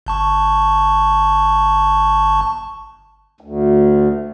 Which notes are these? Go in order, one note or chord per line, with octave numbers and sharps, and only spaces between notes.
G1 A5 C#6
D2